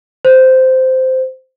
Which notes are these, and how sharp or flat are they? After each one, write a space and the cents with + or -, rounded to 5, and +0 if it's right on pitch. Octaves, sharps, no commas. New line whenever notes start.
C5 -10